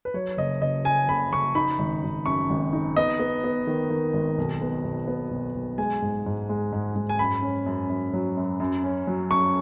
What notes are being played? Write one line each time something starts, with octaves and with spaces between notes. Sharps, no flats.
B4
F#3 C#5
F#1 D#5
F#1 D#5
F#2 G#5
F#1 B5
F#1 C#6
D#4 B5
G#1
G#1
F#2 C#6
G#1
D#4
B3 D#5
B3
B3
D#3
D#3
G#1
B1
B3
B1
B3
B1
B1
G#3 G#5
G#2
G#2
G#3
G#2
G#2
G#5
F#2 B5
C#4
F#2
F#2
F#3
F#2
F#2
C#4
F#3
F#2 C#6